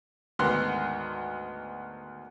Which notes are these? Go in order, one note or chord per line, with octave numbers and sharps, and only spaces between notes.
D2 G#2 D#3 B3 C6 F#6